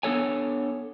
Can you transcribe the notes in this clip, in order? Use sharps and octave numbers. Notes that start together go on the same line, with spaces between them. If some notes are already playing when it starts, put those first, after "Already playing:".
B3 D4 A4 C#5 G#5